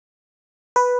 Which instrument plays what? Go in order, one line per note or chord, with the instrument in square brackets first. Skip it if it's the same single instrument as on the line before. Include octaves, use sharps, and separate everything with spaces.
[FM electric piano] B4